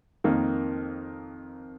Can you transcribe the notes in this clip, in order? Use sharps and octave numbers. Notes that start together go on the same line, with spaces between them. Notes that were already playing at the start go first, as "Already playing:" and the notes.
F2 D#3 A#3